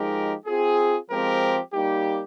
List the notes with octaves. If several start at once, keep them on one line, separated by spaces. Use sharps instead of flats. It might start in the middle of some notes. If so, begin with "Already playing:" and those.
Already playing: F3 G#3 D#4 G4 A#4
C4 F4 G#4
F3 G#3 C4 G4 A#4
G3 A#3 D#4 G4